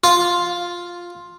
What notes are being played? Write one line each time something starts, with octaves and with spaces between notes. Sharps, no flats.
F4